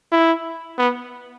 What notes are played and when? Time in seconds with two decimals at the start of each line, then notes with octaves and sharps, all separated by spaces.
0.12 E4
0.78 B3